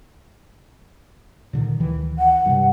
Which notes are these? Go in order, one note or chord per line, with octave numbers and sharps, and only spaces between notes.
A#2 D3 D#3
D2 D#3 E3
F#5
G2 C3